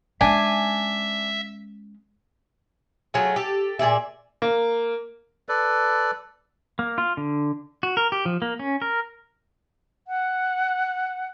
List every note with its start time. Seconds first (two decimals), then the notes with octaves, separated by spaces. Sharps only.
0.21 G#3 C#4 D4 E5 G#5
3.14 F#3 A3 F4 G#4
3.36 G4 A4
3.79 A#2 G#4 D5 E5
4.42 A#3
5.49 A4 B4 D5
6.79 A#3
6.98 F4
7.17 D3
7.83 F#4
7.97 A#4
8.12 G4
8.26 F3
8.42 A#3
8.59 C#4
8.82 A#4
10.08 F#5